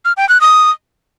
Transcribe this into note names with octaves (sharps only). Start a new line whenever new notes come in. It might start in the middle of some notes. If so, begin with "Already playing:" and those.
F6
G5
F#6
D#6